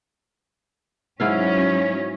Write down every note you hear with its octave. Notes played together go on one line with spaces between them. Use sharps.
G#2 F#3 C#4 E4 F5